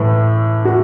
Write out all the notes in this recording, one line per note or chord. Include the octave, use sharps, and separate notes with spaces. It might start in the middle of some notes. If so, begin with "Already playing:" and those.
Already playing: A2 E3
F#4